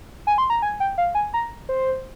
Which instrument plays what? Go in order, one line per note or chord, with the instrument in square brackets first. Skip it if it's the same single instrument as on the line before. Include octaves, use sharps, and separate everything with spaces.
[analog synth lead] G#5
C6
A#5
G#5
G5
F5
G#5
A#5
C5